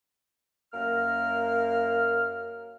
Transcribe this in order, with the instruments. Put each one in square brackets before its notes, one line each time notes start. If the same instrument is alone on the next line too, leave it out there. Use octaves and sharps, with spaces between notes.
[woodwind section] F#2 A#3 A#4 F6